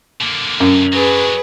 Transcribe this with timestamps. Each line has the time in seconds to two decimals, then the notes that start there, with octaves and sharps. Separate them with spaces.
0.21 D3 A#3
0.60 F#2
0.93 F#3 D4 G#4 B4